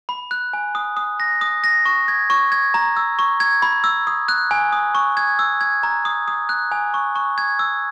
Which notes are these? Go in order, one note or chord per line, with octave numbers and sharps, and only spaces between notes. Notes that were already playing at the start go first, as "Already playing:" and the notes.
B5
F#6
G#5
D#6
D#6
A#6
D#6
A#6
C#6
G#6
C#6
G#6
A#5
E6
C#6
G#6
B5
E6
D#6
F#6
G#5
D#6
C#6
G#6
E6
G#6
A#5
D#6
D#6
F#6
G#5
C#6
C#6
G#6
E6